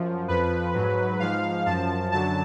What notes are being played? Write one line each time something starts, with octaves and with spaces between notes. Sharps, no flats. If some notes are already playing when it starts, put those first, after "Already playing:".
Already playing: F#2 F3
F2 F3 B4
G#2 F#3
G#2 F3 F5
F#2 F3 A5
F#2 D3 F#3 A5